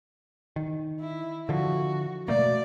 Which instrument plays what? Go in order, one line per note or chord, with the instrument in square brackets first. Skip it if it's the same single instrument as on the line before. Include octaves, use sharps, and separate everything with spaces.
[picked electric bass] D#3
[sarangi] E4
[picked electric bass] D3 F3 [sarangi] F#4
[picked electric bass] B2 A3 A#3 [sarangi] D5